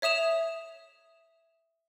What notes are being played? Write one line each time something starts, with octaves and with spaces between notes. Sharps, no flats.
C#5 E5 D#6 E7 F7